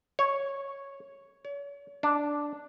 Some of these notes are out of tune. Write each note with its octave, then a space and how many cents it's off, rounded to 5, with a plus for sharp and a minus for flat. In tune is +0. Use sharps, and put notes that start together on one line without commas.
C#5 -5
C#5 +40
D4 -5